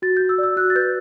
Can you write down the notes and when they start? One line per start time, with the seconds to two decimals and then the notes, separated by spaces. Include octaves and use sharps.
0.02 F#4 A6
0.17 F#4 G6
0.29 E6
0.38 D5
0.43 E6
0.57 F#4 F#6
0.70 A6
0.75 B4 G6